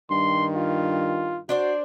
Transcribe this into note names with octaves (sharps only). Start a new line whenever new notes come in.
G2 D#3 C6
F4
D4 F#4 C5 D5